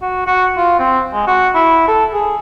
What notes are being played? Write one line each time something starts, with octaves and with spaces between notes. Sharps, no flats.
F#4
F#4
F4
C4
G#3
F#4
E4
A4
G#4